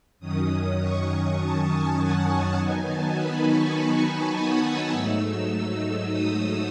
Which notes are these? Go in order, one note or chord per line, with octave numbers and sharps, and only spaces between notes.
F#2 D#3 F#3 C#4 D#6
C#6
A5
G#5
F#5
A5
D#3 F#3 B3 D#4 G#5
A5
B5
C#6
D#6
E6
G#2 F#3 A3 D#4
D#6